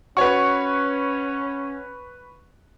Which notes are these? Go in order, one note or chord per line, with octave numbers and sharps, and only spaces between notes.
C#4 F#4 B4 C#5 C#6